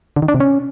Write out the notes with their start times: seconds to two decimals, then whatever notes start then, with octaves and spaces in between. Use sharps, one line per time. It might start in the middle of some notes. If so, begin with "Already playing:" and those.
0.16 D3
0.22 D#3
0.28 D4
0.34 C3
0.40 C#4